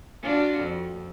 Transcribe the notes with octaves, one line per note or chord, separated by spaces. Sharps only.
D4 F4 F#4
F2